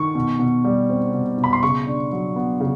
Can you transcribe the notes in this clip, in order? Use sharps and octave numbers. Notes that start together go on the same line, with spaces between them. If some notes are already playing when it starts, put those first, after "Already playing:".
Already playing: D#3 C#6
B2
B2
G3
C4
B2
B2
B5
C6
C#3 C#6
D4
F#3
B3
C#3